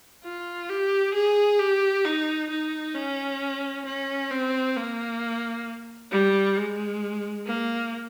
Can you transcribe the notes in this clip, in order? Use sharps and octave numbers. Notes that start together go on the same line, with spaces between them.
F4
G4
G#4
G4
D#4
D#4
C#4
C#4
C4
A#3
G3
G#3
A#3